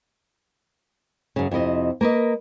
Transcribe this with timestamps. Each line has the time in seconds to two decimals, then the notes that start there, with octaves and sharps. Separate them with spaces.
1.36 F#2 C#3
1.51 F2 C3 E4 D#5
2.01 A#3 A#4 B4 D#5